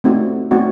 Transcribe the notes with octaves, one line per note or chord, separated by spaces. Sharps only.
A3 C4 D#4 F#4
A3 C4 D#4 F#4